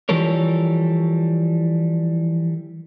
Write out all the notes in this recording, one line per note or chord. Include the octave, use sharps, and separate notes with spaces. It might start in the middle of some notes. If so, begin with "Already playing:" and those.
E3 F3 G3 A4 A#4 C#5